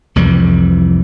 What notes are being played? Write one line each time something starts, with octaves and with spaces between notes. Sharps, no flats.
C2 F2 E3 G3